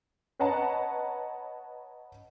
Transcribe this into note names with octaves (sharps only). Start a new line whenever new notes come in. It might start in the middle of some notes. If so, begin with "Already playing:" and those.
B4 C#5 D#5 F#5 A5 A#5